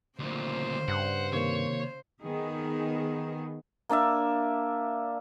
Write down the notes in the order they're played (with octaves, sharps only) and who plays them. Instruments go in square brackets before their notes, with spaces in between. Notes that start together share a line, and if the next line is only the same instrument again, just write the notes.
[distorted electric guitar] D2 A#2 [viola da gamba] C#3 C5
[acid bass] G2 [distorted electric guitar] F#5
[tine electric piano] C3 D#3 A#3 [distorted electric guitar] C#5
[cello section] D#3 B3 G#4
[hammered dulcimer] A#3 D4 D5 E5